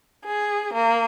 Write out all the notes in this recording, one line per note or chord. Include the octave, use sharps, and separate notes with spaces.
G#4
A#3